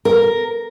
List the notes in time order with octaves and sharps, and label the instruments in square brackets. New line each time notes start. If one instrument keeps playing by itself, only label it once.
[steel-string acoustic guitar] A#4